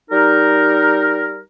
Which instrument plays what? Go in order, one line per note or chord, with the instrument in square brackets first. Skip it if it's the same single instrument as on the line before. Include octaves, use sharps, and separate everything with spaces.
[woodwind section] G3 D#4 A#4